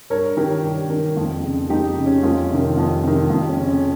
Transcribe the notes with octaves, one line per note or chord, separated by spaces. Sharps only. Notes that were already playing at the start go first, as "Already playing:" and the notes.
G2 A#4 C#5
D#3 G4 A#4
G2
D#3
F2
C#3
F2 D#4 G4
C#3
C#4
F2 C#4 F4
C3 D#3
F2
C3 D#3
F2
C#4
C#3
C#4